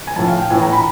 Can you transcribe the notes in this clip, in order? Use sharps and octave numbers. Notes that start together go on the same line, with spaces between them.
G#5
A2 F3 A5
F5
G5
A2 E3 G#5
A#5
B5